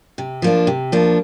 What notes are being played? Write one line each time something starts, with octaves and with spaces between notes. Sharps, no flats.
C3
F3 A#3 D4
C3
F3 A#3 D4